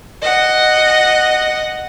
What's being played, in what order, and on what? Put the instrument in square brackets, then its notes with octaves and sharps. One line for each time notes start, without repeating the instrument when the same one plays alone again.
[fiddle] D#5 F#5